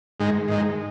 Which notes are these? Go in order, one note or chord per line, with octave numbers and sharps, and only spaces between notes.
G#2 D#3 G#3
G#2 D#3 G#3